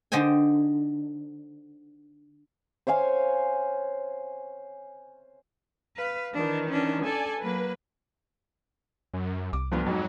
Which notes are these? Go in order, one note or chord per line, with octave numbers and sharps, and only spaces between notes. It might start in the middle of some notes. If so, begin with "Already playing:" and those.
D3 D#4 C5 G5 G#5
C5 C#5 F5 G#5
B4 F5
D#3 E3 D4
C#4 D4
A4 D5 G#5
F#3 A#3 B4
F#2
C2 D6
D2 G2 F3 B3
F2 G#2 F#3